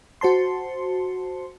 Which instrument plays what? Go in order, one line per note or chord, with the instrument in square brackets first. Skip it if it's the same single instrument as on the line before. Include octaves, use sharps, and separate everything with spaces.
[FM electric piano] F#4 C5 A5 C6